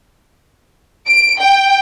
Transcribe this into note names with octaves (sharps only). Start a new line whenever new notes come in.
D7
G5